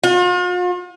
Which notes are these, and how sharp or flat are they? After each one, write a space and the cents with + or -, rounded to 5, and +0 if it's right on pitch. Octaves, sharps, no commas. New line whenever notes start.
F4 +45